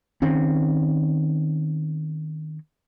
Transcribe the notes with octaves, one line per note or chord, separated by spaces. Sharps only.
D#3 C4 C#4